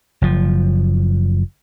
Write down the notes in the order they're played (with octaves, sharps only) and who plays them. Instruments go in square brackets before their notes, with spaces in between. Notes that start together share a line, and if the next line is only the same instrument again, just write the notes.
[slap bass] F#1 F3